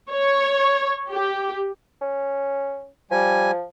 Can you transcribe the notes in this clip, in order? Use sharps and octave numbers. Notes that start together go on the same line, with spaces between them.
C#5
G4
C#4
F3 G3 G#5